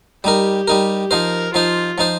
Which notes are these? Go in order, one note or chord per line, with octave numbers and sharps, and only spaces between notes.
G3 D#4 G4 A#4
G3 D#4 A#4
F3 D#4 A#4 C5
F3 D#4 F4 C5
F3 D#4 C5